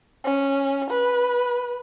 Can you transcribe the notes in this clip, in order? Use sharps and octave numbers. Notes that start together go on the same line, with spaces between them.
C#4
B4